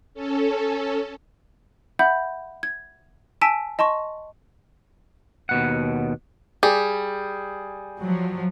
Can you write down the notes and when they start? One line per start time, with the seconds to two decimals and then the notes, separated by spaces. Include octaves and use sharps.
0.14 C#4 A4
1.99 E5 F#5 B5 G6
2.63 G#6
3.41 G#5 A5 E6 B6 D7
3.79 D#5 A5 C6 C#6
5.49 D#2 B2 F#5
6.63 G3 G#4
7.99 F3 F#3